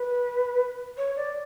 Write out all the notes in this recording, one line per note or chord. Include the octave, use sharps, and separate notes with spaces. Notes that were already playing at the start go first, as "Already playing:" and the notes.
Already playing: B4
C#5
D5